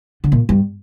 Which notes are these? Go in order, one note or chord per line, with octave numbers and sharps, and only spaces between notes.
D3
A#2
G2